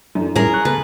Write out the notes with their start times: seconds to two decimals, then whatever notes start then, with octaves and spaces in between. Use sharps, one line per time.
0.15 F#2 E3 A3 D4
0.36 A2 G3 C#4 E4 G#4 A#4
0.54 C#6 F#6
0.65 C#3 A3 B3 B4 A5